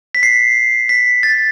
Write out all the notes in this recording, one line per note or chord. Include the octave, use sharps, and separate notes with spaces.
B6
C7
B6
A6